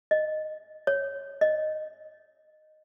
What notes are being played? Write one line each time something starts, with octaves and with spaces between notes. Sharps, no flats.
D#5
C#5
D#5